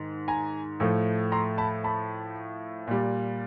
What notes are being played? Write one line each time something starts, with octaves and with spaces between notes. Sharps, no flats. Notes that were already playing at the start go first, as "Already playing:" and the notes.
Already playing: G#2 D#3
G#5 A#5
A2 F3 A3
A#5 C6
A5 B5
A5 B5
A#2 G3